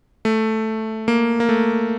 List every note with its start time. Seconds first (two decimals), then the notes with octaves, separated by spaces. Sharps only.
0.25 A3
1.08 A#3
1.40 A#3
1.49 A3